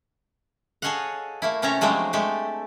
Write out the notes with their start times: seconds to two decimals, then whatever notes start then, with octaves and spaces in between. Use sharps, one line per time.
0.82 G#4 A4 C#5 D#5 F5 F#5
1.42 A3 A#3 E4
1.62 C3 A3 C#4 A4 C#5 A#5
1.81 F3 F#3 G#3 A3 C4 D4
2.13 G#3 A3 G4 A4